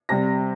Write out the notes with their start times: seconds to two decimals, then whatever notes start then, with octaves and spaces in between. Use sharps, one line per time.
0.09 C3 G3 A#6